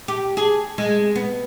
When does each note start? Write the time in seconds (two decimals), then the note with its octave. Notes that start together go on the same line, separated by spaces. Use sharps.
0.08 G4
0.37 G#4
0.78 G#3
1.16 B3